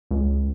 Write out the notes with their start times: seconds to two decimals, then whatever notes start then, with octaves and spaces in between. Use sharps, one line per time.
0.11 C#2